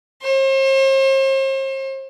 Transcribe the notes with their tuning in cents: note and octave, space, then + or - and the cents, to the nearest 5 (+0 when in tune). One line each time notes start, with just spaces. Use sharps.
C5 +40